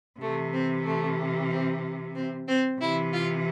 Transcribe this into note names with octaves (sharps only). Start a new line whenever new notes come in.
C3 E3 A3
C4
A3
C4
C4
C4
C3 E3 E4
F4